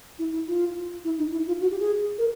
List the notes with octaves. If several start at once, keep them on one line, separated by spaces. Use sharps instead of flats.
E4
E4
F4
E4
D#4
E4
F4
F#4
G4
G#4
A#4